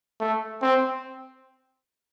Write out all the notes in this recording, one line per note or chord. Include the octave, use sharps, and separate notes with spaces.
A3
C4